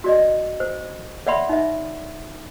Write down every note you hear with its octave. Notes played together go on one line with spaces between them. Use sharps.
F#4 D5 D#5
C5
C#5 D5 E5 F#5 B5 C6
D#4 E5